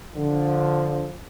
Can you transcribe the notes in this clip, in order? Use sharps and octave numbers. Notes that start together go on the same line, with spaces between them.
D3 F3